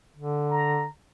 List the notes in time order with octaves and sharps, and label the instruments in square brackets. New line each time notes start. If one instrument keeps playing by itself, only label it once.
[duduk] D3
[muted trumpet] A#5